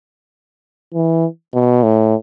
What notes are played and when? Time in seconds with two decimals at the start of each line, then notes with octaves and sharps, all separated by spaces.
0.94 E3
1.54 B2
1.83 A2